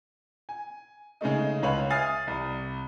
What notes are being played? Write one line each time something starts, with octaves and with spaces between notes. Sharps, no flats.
G#5
C#3 G#3 A3 D#4
C#2 B4 C#5 F5 F#7
E5 G#5 D#6 F6 A6 C7
C2